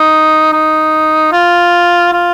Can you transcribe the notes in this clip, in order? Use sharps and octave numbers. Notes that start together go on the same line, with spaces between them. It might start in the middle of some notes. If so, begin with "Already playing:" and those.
Already playing: D#4
D#4
F4
F4